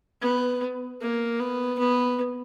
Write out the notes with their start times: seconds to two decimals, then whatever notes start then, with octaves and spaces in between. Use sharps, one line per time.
0.22 B3
1.01 A#3
1.40 B3
1.79 B3